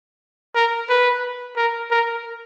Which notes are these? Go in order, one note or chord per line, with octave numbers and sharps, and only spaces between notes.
A#4
B4
A#4
A#4